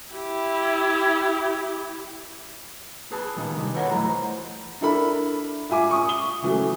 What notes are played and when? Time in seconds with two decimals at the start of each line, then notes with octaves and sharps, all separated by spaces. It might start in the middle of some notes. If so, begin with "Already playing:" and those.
0.14 E4 G4
3.12 G#4 B4 A5
3.36 A#2 D#3 G#3 D#4 F4
3.56 C3 D#3 G3 G#3
3.74 F4 A4 B4 C#5 D#5 F#5
3.90 F#2 E3 F#3 A3 F4 A#5
4.08 C5
4.81 D4 E4 A4 A#4 B5
5.70 F4 E5 G#5 D6
5.91 C#6 D#6
6.09 G7
6.42 C#3 E3 F#3 A3